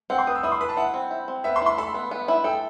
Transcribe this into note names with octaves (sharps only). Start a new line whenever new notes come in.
C4 F#5
C6
B4 D#6
E6
E4 D#6
C6
B4 B5
A5
E4 F#5
C4
E4
C4
B3 E5
C6
E4
C6
A4 B5
B3
B3
E4
A4 G5